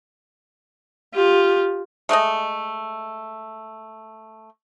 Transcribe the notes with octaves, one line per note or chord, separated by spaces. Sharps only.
F4 G4
G#3 A3 A4 D#5